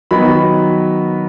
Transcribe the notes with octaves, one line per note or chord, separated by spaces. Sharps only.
D#3 F#3 B3 D#4 B5